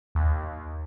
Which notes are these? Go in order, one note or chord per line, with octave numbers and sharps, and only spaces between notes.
D#2